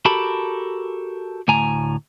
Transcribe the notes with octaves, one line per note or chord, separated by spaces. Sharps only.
F#4 G4 A4 A#4 A5 B5
D2 A2 G#5 A#5